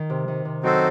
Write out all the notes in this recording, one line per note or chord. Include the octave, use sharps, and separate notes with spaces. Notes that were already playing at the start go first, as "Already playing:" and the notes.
Already playing: D#3
C3
D#3
C3
F#2 C4 D#4 F#4 A4 C5